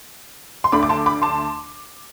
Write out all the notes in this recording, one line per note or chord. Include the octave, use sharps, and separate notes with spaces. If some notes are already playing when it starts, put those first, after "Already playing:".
C6
D2 D3 A3 D4 B5 D6
D6
A5 C6
B5 D6
A5 C6